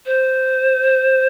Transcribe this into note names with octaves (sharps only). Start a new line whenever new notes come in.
C5